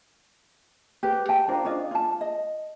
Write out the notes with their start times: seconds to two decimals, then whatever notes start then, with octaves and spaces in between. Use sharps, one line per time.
1.03 G4 B4
1.29 G5 A5
1.48 D4 F4 A#4 C5
1.64 C#4 D4 F4 D#5
1.91 F4 A5
2.21 D#5